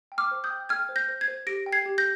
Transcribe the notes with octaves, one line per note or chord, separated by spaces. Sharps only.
G5
D6 F6
C5
D#6 G6
G5
G5 F6 G#6
C5
G6 A#6
C5
G#6 C7
C5
G4 A#6 D7
G5
G#6 C7
G4
G6 A#6